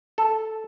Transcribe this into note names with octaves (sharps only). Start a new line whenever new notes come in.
A4